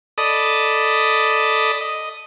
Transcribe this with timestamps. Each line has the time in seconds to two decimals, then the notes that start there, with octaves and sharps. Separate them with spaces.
0.18 A4 D5 D#5 B5 D#6
1.81 D#5